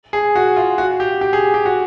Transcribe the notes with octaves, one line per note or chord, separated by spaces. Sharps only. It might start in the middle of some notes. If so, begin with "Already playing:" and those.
G#4
F#4
F4
F#4
G4
G4
G#4
G4
F#4